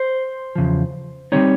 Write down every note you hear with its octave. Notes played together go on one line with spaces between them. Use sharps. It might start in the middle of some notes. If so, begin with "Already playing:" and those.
Already playing: C5
E2 C#3 F3
D3 G3 C4 D#4 C#5